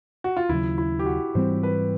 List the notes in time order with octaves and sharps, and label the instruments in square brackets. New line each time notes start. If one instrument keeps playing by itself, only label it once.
[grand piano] F#4
F4
[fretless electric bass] D#2 C#3 F#3 [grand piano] E4
[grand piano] E4
G4
F#4
[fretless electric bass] G#2 E3 G3 C4 [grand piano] C5
[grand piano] B4